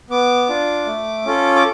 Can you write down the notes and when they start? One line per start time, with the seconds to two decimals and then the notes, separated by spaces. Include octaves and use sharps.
0.10 B3 D6
0.49 D4 F4
0.86 A3
1.25 C#4 F4 A4
1.56 D6